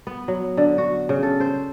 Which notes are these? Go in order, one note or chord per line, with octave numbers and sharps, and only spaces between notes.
B3
F#3
D3
F#4
C#3
A4
C5